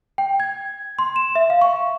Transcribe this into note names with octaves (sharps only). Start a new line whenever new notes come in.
G5
G#6
C6
E7
E5
F5
C#6